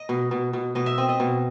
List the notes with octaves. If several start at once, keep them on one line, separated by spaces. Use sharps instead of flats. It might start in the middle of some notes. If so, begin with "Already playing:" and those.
Already playing: D#5
B2
B2
B2
B2 D#5
E5
C4 D#5
D#5
B2